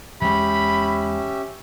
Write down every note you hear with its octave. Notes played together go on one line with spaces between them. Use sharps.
E2 G#3 C#4 G4 E5 B5